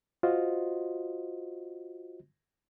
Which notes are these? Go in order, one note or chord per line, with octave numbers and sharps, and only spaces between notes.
F4 F#4 C5 D#5